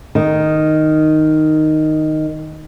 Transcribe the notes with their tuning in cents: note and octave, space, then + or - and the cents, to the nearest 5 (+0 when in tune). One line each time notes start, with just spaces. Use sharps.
D#3 -5